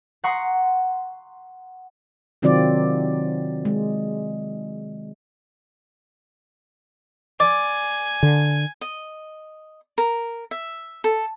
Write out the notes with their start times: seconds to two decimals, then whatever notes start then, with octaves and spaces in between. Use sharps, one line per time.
0.24 F#5 A#5 C6 C#6 D#6
2.42 C3 D#3 F#3 C4 F4 D5
3.65 G#3
7.40 D5 G#5
8.23 D3
8.81 D#5
9.98 A#4
10.51 E5
11.04 A4